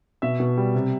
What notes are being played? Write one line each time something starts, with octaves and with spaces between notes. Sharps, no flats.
B2 E5
B2
G3
C3